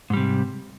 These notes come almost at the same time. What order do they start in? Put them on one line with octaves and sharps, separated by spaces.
G#2 G3 C3